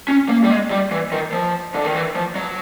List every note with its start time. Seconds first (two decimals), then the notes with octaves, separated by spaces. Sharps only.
0.08 C#4
0.29 A#3
0.44 G3
0.50 G#3
0.71 G3
0.91 E3
1.12 D#3
1.33 F3
1.74 D3
1.85 D#3
1.95 E3
2.15 F3
2.36 F#3